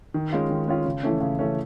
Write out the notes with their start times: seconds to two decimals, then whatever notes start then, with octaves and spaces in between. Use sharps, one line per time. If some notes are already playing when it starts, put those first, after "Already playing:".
0.14 D#3
0.33 G#3 C#4 F4
0.51 D#3
0.68 G#3 C#4 F4
0.86 C#3
1.03 E3 A3 C#4
1.21 C#3
1.39 E3 A3 C#4